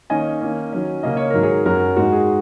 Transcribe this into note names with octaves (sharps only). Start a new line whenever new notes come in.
D#3 A#3 C#4 D#5 G#5
D#3 A#3 C#4
D#3 F#3 C#4
C#3 A#3 C#4 D#5
C#5
G#2 D#3 F#3 A#4
G#4 C#5
F#2 F#3 C#4 F#4 A#4
G#2 G#3 D#4 F#4
G#4